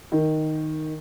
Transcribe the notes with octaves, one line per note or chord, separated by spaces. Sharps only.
D#3